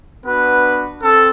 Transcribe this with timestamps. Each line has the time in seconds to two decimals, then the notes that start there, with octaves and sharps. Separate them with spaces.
0.25 B3 D4 F#4 B4
1.02 C4 A4